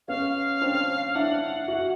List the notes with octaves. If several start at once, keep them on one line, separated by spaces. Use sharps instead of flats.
B3 C#4 F5
C4 D4
D4 E4 F#5
E4 F#4